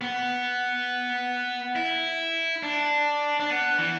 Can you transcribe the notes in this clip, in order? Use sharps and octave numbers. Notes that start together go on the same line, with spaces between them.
B3
E4
D4
D4
B3
E3